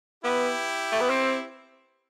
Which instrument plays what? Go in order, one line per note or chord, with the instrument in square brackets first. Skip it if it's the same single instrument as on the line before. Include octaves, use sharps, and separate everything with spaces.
[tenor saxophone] B3 [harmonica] E4 G4
[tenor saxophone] A3
B3
C4